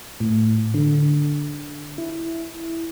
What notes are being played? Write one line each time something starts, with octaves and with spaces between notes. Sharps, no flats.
A2
D3
E4